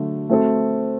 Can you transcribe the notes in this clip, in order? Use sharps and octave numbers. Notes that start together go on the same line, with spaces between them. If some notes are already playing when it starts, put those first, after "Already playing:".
Already playing: D3 F#3 A3
A3 C4 F#4 A4 C5